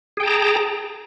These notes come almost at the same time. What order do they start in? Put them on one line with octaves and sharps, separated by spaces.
G#4 G5 A5 A#5